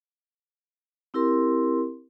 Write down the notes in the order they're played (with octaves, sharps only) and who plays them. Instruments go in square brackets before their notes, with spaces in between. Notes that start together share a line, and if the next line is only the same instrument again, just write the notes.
[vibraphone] C4 E4 G4 A#4 C6